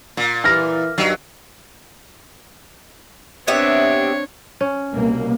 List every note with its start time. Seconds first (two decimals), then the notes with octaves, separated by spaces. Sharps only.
0.17 A#2
0.44 E3 F6 A#6
0.98 G2 D#3 F#3
3.48 B3 C4 D4 G4 C#5 E5
4.61 C#4
4.93 C2 B2 A#3